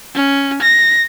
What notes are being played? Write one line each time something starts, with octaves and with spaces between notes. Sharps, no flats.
C#4
A#6